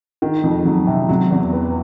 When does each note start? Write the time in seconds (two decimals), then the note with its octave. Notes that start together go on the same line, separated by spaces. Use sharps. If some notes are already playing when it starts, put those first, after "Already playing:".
0.22 D#3
0.44 F2
0.65 F#3
0.87 C3
1.09 F#3
1.31 E2
1.53 B3